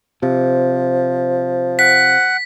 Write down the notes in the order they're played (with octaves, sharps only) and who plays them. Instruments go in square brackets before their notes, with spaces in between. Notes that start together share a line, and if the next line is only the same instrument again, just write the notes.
[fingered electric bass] C3 [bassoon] F3
[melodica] F#5 [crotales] B6